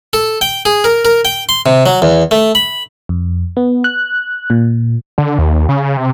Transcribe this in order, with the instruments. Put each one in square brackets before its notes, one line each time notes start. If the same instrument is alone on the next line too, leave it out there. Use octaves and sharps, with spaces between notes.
[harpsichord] A4
G5
G#4
A#4
A#4
G5
C6
C3
F#3
E2
A3
B5
[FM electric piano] F2
B3
F#6
A#2
[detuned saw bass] D3
D#2
C#3
C3